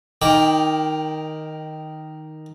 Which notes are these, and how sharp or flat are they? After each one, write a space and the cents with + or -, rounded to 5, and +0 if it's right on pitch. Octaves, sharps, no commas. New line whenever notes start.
D#3 +0 G5 +20 D6 +0